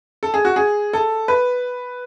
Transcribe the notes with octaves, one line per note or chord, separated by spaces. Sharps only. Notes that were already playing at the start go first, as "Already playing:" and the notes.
A4
G#4
F#4
G#4
A4
B4